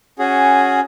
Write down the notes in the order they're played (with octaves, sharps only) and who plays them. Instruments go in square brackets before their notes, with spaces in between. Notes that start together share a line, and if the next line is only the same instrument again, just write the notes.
[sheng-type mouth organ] C#4 F#4 G#4